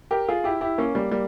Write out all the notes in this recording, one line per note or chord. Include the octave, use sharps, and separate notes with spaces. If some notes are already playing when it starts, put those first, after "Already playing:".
G4 A#4
F4 G#4
E4 G4
E4 G4
A#3 C#4
G3 A#3
G3 A#3